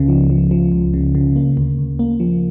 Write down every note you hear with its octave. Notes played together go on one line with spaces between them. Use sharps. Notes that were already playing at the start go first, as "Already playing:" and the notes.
Already playing: C#2 C#3
F3
F3
F3
C#2
C#3
C#3
A#3
D2
D2
A#3
F3